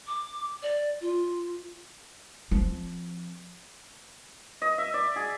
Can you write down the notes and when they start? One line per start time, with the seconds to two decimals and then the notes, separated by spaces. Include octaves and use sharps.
0.07 D6
0.63 D5
1.01 F4
2.51 F3 C4
4.62 D#5
4.78 E5
4.94 D5
5.16 G#4